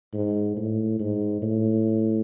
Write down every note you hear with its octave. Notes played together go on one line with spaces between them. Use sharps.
G#2
A2
G#2
A2